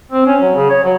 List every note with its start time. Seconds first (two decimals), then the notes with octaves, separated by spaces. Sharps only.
0.12 C4
0.27 C#4
0.41 F#3
0.55 C#3
0.70 C#5
0.84 F#3